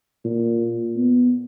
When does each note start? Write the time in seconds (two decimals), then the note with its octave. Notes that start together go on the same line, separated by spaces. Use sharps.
0.25 A#2
0.96 B3